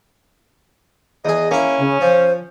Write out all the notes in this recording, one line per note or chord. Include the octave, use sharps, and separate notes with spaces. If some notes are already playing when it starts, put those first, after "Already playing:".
E2 G#4 D#5
A#3 C#4 E4
C#3
F3 C5